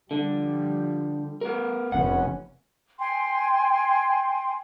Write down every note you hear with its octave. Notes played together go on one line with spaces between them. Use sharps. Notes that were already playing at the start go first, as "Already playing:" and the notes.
D3 F3 G3
B3 A#4
F1 B3 C#4 F#5
G5 G#5 C6